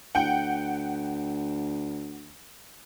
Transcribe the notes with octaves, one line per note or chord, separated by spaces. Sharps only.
D2 F#5 G5